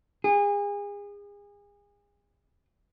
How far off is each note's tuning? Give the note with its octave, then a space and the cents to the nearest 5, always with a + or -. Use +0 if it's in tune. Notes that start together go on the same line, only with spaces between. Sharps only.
G#4 -35